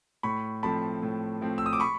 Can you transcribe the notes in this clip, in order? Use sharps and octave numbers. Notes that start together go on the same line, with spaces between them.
A2 B5 C#6
F3 A3 C4 A5 B5
A2
F3 A3 C4
E6
D#6
D6
B5 C#6